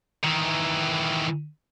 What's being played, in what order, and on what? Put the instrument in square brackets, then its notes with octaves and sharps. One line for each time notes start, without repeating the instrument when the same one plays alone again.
[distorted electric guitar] D#3 E3